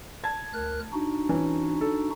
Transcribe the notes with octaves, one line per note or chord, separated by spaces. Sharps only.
A5 G#6
D2 A#4 F#6
D4 D#4 F#4
E3 C#4
A4